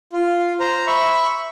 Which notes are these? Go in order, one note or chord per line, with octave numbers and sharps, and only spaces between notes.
F4
C5 A#5
E5 B5 C#6